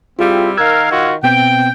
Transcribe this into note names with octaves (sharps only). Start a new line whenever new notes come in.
G3 C4 E4 F4 G#4 F5
D#3 A#4 F5 E6 F#6 G#6
D#3 F4 F#4
B2 B3 C4 G5